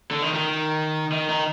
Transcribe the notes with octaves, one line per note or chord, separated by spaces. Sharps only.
D3
D#3
D#3
D#3
D#3